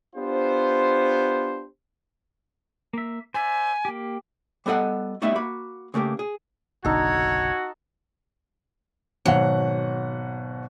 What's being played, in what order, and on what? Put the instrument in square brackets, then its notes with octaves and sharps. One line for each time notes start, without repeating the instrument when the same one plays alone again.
[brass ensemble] B3 D4 F4 G4 C5
[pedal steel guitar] A#3 E5
[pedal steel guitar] C5 D5 E5 [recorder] G#5
[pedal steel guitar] A#3 G4
[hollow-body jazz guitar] G3 B3 A4 D#5 F#5
G3 A3 B3 D#4 E4 E5
A#3 F#4 B5
C#3 A3 A#3 G4
G#4
[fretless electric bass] F#1 B1 D3 [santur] D#4 A4 [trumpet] F#4 [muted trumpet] C#5
[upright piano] G#1 B2 F#5 [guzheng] F#3